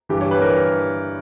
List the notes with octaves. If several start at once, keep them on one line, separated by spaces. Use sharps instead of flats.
G2 E3 G4
C#5
B4
E3 A#4